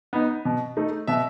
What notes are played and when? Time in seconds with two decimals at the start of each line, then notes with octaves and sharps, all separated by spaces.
0.13 B3 D#4
0.45 B2
0.77 A3 D#4
1.07 B2 E5